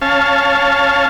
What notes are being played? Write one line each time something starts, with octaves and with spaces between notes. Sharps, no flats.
C#4 F5 A5